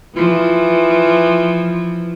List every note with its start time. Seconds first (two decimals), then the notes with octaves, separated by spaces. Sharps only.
0.15 E3 F3